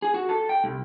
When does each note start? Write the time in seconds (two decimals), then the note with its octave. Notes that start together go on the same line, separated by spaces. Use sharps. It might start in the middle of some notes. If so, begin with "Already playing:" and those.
0.02 G#4
0.14 F#4
0.29 A4
0.49 G5
0.64 C2